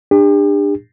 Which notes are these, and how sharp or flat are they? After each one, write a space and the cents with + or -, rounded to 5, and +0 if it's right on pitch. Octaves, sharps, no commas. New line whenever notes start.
D4 +20 G4 +45